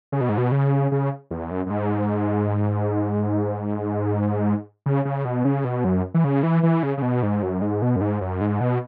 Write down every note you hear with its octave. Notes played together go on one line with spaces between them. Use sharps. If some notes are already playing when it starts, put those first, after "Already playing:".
C#3
B2
G#2
B2
C#3
C#3
E2
F#2
F#2
G#2
C#3
C#3
B2
C#3
B2
F#2
E3
C#3
E3
E3
C#3
C#3
B2
G#2
F#2
G#2
B2
F#2
G#2
F#2
G#2
B2